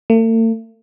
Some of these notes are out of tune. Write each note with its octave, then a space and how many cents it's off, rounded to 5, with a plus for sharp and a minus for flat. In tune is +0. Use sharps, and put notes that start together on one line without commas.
A3 +45